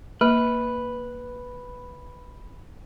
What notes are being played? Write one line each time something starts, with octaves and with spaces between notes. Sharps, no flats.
A#3 B4